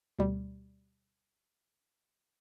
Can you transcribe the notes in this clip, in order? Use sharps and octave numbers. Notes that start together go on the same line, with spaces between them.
D2 B2 G3